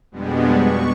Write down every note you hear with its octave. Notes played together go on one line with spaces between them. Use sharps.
F2 B2 G3 G#3 B3 D4
C#6